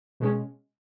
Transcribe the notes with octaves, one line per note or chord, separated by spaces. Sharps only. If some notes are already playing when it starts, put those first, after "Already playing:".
B2 G#3 C#4